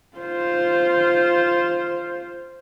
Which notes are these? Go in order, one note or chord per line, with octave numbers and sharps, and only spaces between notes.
F4 C5